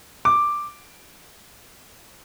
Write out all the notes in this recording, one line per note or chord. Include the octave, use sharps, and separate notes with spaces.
D6